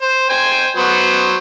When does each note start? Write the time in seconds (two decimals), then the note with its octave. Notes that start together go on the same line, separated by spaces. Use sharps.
0.02 C5
0.30 C5 G5 G#5
0.77 F#3 B3 C5